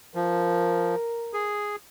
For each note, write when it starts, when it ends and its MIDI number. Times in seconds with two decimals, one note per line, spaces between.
0.15 0.95 53
0.15 1.57 70
1.33 1.76 68